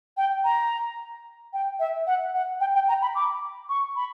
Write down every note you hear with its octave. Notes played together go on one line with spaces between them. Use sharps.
G5
A#5
G5
E5
F#5
F#5
G5
G5
A#5
B5
D6
C#6
B5